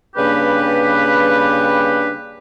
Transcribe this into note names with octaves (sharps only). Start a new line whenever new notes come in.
C#3 G3 A#3 D4 G4 B4